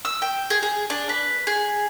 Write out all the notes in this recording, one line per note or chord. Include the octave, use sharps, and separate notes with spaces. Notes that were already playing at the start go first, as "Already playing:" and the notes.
E6
G5
G#4
G#4
D4
B4
G#4